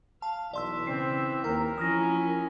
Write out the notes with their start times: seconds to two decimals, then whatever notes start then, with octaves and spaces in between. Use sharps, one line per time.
0.22 F5 A5
0.54 B1 E3 D5 E5 C6 E6
0.87 C#3 C4 C7
1.44 D#2 A#4 G5
1.78 F3 C#4 E4 D#6 F6 A#6